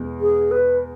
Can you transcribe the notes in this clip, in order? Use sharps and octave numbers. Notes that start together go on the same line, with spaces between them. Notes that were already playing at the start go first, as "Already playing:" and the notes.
Already playing: E2 B2 G#3
G#4
B4